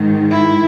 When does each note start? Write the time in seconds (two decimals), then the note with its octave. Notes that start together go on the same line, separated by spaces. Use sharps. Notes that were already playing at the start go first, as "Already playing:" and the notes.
Already playing: G#2 D#3
0.30 E4